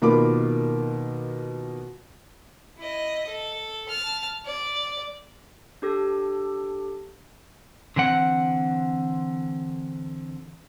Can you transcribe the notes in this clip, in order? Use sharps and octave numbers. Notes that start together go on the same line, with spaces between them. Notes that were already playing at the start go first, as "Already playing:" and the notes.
B2 D#3 A#3 F4 B5 D6
E4 D#5
A4
A5 F6
D5
D4 G4 A4
D3 E3 C4 F#5